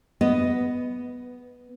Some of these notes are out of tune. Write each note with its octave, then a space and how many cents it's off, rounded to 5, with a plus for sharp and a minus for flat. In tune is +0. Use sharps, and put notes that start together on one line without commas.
B3 +0 B4 +20 D#5 +0